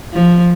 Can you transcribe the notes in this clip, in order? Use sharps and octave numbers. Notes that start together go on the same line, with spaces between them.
F3